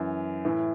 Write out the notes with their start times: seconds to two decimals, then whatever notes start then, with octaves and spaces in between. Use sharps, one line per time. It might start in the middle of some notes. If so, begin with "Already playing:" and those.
Already playing: F#2 E3
0.45 A2 E3